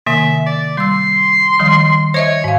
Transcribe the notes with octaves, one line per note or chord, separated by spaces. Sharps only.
C3 D#3 A#3 E5
D5
G3 C6 E6
D#3 F3 G3
C5 C#5 D#5 E5
G#2 F5